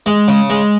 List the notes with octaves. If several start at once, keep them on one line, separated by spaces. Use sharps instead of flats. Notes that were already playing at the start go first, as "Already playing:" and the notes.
G#3
C#3
G#3